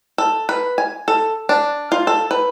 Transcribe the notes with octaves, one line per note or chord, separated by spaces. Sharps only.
A4
B4
G#5
A4
D4
F4
A4
B4